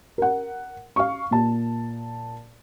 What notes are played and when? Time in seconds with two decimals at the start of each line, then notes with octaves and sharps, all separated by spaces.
0.18 A#4 F#5
0.96 F5 C#6
1.31 A#2 A5